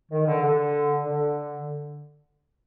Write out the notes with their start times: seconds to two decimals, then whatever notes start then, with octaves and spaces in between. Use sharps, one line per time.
0.12 D#3
0.27 D3
0.43 D3
1.04 D3